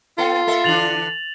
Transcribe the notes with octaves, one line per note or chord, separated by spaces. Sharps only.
B3 F4 A4
A#3 A4 E5
D3 E3 D4 A6 F7 F#7